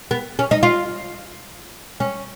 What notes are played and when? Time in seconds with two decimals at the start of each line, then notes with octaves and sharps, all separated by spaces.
0.11 B3
0.39 C#4
0.51 D#4
0.63 F4
2.00 C#4